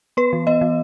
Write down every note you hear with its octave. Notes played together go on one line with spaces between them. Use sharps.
B3 B4
E3
B3 D#5
E3